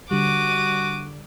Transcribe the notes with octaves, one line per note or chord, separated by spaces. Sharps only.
D3 G3 F#4 D6 D#7